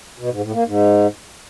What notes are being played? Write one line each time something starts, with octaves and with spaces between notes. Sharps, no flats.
B2
G#2
A2
A#3
G#2